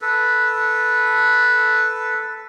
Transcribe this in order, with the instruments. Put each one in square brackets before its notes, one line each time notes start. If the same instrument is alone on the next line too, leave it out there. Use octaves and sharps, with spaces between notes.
[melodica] A4 B4